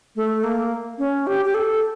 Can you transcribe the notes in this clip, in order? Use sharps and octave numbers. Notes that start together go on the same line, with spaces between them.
A3
A#3
C#4
G4
G4
A4